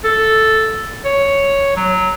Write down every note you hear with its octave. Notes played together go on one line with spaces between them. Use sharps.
A4
C#5
F#3